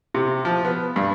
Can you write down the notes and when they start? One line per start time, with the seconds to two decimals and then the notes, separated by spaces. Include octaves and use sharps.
0.14 C3
0.45 F3
0.65 B3
0.96 G2